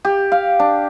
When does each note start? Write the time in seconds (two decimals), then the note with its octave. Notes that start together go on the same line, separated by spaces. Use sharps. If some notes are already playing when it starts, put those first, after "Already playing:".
0.05 G4
0.32 F5
0.59 D4